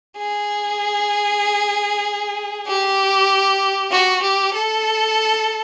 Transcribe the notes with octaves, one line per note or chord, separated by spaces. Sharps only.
G#4
G4
F#4
G4
A4